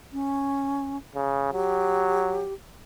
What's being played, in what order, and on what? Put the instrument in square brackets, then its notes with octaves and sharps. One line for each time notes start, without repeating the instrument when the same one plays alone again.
[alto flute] C#4
[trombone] C#3
[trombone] F#3 [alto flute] G4